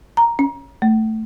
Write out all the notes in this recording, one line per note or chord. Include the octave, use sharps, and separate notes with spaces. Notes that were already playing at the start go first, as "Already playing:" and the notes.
A#5
C#4
A3